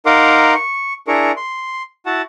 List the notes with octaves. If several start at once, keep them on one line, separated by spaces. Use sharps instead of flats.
D#4 A#4 F5 F#5 C6 D6
C#6
D4 E4 G#4 A#4 C#6
C6
E4 F#4 F#5 A5